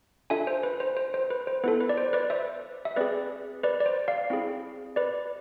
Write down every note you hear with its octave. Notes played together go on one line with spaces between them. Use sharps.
D4 F4 A4 E5 G#5
C5
B4
C5
C5
C5
B4
C5
B3 E4 A4 B4
B4
D5
C5
B4 D5
C5 E5
E5
C4 G#4 B4 D5
B4 D5
D5
C5
D5 F5
C4 E4 G#4
B4 D5